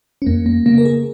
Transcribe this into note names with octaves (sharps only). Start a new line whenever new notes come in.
C#4
F2 A#3
A#3
C#3 A#3
A#4
G#4